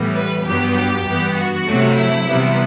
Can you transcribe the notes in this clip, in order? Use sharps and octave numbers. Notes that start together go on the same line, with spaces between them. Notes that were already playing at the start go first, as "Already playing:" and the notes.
Already playing: A2 E3 G3 B3
B4
G2 F#3 B3 G4
G2 E3 B3
F#4
C3 F#3 A3
E4
C3 E3 G3 B3